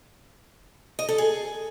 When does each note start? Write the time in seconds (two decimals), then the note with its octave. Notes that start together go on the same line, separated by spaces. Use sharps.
0.99 D#5
1.09 A4
1.18 G#4